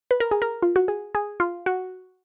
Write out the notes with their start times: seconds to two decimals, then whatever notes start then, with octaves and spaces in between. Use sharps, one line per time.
0.11 B4
0.20 A#4
0.31 G#4
0.42 A#4
0.63 F4
0.76 F#4
0.88 G#4
1.15 G#4
1.40 F4
1.66 F#4